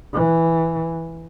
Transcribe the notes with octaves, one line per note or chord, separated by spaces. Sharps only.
E3